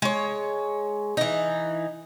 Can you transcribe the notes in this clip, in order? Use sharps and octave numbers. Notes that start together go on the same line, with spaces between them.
G#3 C#5
E3 D#4